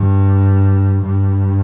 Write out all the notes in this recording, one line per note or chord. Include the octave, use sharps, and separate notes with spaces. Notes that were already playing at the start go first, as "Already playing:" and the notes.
Already playing: G2
G2